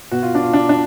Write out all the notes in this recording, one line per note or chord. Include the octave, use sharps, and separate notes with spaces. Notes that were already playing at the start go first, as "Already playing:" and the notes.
B2 F#4
F4
D4
F4
D4
D4